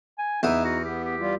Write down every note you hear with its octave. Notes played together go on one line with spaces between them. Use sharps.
G#5
E2 D#4 E5 D#6
F#4
B3 G4
G4
G3 F4